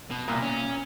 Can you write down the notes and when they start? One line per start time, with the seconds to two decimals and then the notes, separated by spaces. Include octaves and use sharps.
0.11 B2
0.28 C2 A#2
0.43 C#4